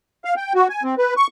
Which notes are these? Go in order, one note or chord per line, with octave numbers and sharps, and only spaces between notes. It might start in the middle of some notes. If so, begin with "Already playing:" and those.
F5
G5
F#4
G#5
C4
B4
C#6